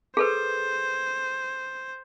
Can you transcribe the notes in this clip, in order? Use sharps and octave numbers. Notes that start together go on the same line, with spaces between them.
G#4 A4 B4 C5